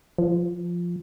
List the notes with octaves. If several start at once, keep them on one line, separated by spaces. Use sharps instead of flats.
F3